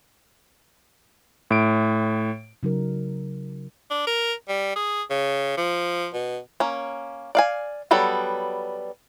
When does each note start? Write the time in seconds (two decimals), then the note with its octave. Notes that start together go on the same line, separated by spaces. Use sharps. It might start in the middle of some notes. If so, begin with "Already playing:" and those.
1.51 A2 D7
2.63 C#3 F#3 D#4 A#4
3.91 D4
4.07 A#4
4.48 G3
4.76 G#4
5.10 C#3
5.57 F3
6.14 B2
6.60 A#3 C#4
7.35 D5 F5 G#5
7.91 F#3 G3 B3 A4